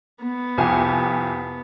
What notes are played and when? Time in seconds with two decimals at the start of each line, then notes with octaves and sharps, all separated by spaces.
0.22 B3
0.58 C2 F2 G#5